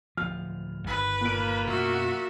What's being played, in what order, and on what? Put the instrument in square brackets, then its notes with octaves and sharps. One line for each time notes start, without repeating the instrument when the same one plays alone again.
[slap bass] D1 F3 [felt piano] F6
[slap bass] G1 D#3 [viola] B4
[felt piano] A#2 D7 [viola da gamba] A#3 F4
[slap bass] F#2 B2 [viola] F#4 E5